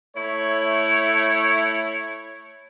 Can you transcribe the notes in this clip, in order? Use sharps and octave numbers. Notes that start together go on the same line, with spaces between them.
A3 E4 C#5